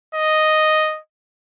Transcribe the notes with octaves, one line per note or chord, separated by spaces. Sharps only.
D#5